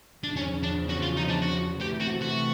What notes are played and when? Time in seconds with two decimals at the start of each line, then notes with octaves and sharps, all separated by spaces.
0.23 E2 C#3 F3 D4
0.36 C#4
0.63 D4
0.89 F#4
1.02 F4
1.16 D#4
1.28 D4
1.42 F#4
1.81 C3 E3 A3 G4
2.00 F#4
2.21 F#4